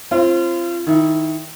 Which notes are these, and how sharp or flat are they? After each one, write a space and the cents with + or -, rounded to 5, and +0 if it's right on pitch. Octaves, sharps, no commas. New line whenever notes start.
C4 +25 F4 -30
D#3 +15 E4 +0